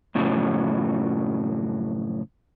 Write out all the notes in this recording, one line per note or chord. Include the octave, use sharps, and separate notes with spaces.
F#2 A2 C#3 F3 F#3